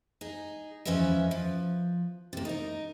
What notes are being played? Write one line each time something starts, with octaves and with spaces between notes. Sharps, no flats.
D#4 G#4
E2 F3 C#4 B4 D#5 E5
F3
C3 A#3
D#4 A#4